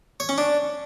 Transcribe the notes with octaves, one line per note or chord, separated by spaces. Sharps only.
C#5
C#4
D4